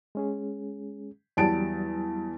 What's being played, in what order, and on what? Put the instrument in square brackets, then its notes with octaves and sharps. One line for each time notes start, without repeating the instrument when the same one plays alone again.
[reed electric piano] G#3 C#4 G#4
[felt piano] E2 A5 D7 [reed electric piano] F#3 G3